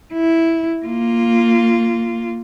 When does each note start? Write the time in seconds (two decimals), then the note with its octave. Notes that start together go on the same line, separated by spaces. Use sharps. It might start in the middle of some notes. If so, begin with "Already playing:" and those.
0.13 E4
0.85 A#3 F4